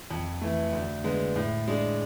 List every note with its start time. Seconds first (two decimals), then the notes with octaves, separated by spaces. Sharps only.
0.11 F2
0.42 E3 A3
0.73 D2
1.04 D3 G#3 B3
1.36 A2
1.68 G#3 D4 G#4